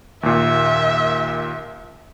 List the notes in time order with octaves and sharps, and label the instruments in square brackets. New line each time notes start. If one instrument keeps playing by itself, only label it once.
[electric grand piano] D#2 A#2 [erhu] E5